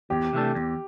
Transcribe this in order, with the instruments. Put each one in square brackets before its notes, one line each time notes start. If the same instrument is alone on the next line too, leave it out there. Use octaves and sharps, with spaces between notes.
[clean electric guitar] E2 [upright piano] G4
[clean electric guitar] C3 E3 A3 D4
E2